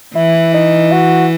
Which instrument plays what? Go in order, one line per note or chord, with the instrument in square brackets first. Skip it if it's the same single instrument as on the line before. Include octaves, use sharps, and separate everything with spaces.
[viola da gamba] E3 [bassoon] E4
[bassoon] D#4
F#4